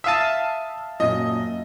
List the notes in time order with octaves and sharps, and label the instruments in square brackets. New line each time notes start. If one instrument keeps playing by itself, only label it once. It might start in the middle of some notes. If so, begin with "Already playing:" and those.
[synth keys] E5 F5 A5 [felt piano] D#6 D#7
[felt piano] F#2 A#2 [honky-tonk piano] D#5